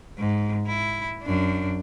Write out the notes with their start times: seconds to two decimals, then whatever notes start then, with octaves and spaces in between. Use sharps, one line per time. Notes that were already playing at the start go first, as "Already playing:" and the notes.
0.18 G#2
0.68 E4
1.22 F#2 D4